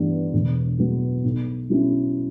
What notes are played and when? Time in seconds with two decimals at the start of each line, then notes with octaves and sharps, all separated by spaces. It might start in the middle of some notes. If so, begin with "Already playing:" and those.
Already playing: G2 E3 B3 D4
0.33 E1
0.78 E2 B2 F#3 B3
1.24 B1
1.70 B2 F#3 C#4 E4